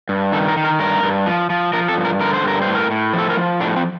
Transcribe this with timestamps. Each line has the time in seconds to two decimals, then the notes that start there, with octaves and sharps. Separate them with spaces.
0.09 G2
0.32 D#3 A4
0.48 A#4
0.57 D#3
0.64 A#4
0.80 G2 A#4
1.03 G2
1.26 F3
1.50 F3
1.73 F3 A#4
1.89 A4
1.97 G2
2.05 A#4
2.21 D3 A#4
2.34 C5
2.44 G2 A#4
2.62 C5
2.67 A2
2.75 A#4
2.91 A2
3.13 F3
3.18 A4
3.30 A#4
3.37 F3
3.60 A2 D4
3.76 C4